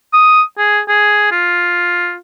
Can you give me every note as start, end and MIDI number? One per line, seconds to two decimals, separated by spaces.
0.13 0.42 87
0.58 0.80 68
0.88 1.28 68
1.32 2.15 65